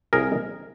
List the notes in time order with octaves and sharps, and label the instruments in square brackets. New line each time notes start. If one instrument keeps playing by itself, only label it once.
[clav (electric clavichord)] C2 G#4 A#4